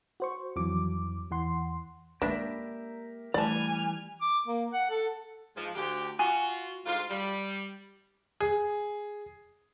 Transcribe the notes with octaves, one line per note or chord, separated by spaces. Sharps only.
F#4 C5 C#6
F2 E3 F#3 D6
E2 E3 F#5 C6
G#3 A#3 D4 G4 A#4 B4 E5
E3 G3 A3 D5 G#5 A5 F6
D6
A#3
F#5
A4
G#2 F3
D2 G4
F4 F#4 G#5
D2 G#2 F4
G3
G#4